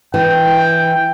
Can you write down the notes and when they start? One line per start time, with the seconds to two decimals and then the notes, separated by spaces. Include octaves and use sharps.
0.14 E3 G5